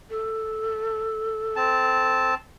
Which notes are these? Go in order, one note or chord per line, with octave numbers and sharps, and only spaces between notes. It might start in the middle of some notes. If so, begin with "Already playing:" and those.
A4
C4 A5